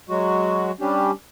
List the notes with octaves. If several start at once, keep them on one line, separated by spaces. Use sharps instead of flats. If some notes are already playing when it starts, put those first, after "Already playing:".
F#3 G#3 F#4
G3 C#4 D4 G4